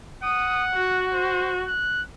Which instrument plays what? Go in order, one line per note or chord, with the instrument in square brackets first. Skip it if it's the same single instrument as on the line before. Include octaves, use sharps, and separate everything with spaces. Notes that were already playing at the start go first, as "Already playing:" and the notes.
[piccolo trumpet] F#5 [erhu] D#6
[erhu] F#4
[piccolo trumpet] C5
F#6